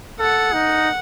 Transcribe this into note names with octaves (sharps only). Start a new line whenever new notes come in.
A4 F#5
D#4